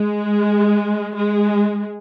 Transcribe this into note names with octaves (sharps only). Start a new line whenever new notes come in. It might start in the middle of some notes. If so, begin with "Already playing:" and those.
Already playing: G#3
G#3